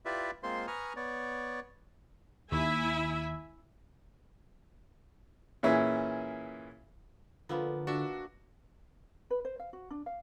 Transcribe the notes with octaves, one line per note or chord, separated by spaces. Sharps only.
E4 F4 G4 B4 D5 E5
G#3 A#3 C4 F4 C5 C6
B4 G#5 A#5 C#6 D#6 F6
B3 C#5 D5
D#2 E4 E5 G#5
A#2 E3 C#4 E4 G#4
D3 F3 A#3 B3 F4 B4 B5
D4 F#4 E5
B4
C5
F5
F#4
D4
F5